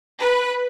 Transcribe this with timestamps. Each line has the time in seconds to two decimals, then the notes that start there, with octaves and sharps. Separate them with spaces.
0.20 B4